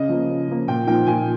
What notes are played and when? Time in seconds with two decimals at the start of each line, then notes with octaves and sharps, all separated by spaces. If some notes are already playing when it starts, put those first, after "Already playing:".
Already playing: C#3 D#5
0.09 F3 A#3
0.29 C#3
0.48 F3 A#3
0.68 A#2 G5
0.87 F3 A#3 D#4 G5
1.06 A#2 G#5